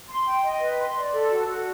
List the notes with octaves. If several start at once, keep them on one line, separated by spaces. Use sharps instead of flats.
C6
G5
D#5
B4
C6
D5
A4
F#4
F#4